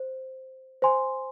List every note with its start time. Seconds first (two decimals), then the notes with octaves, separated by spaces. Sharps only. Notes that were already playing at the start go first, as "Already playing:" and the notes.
Already playing: C5
0.82 C5 G#5 C6